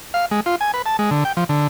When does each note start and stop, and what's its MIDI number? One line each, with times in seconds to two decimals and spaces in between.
0.14 0.26 77
0.31 0.40 56
0.46 0.56 65
0.61 0.72 80
0.74 0.82 71
0.86 0.97 81
0.99 1.10 56
1.11 1.24 50
1.25 1.33 79
1.37 1.44 53
1.49 1.67 50